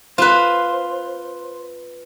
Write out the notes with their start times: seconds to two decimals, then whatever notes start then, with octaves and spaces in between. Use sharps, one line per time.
0.18 F4 B4 C5